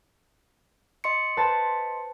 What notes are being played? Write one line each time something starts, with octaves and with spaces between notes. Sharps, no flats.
D#5 C6 C#7
B4 C5 A5